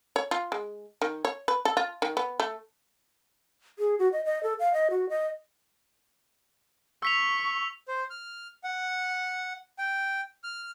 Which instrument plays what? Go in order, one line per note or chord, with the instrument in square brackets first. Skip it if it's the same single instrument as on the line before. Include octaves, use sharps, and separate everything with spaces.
[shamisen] C#5
F4
G#3
D#3
C#5
B4
A4
F4
D#3
B3
A3
[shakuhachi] G#4
F#4
D#5
D#5
A4
F5
D#5
F#4
D#5
[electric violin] C#6 [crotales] E6 B6 F7
[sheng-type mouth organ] C5
F6
F#5
G5
F6